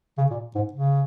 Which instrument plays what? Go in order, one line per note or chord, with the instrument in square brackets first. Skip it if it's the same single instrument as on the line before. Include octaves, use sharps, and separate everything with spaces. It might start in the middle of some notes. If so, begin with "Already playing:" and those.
[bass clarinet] C#3
A#2
G#2
C#3